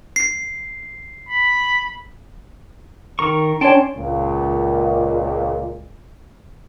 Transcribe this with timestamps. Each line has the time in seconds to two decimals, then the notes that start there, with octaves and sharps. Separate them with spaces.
0.16 C7
1.29 B5
3.19 D#3 A#4 C#6
3.61 C#4 D4 C#5 G5 A5 C6
3.97 C#2 A#2